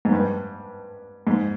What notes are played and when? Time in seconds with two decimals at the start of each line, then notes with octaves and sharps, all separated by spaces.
0.05 G#2
0.12 G2
1.27 G#2